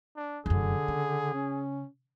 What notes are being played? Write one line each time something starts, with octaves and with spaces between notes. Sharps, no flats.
D4
F1 F#2 D3 G#4
C#3
C#4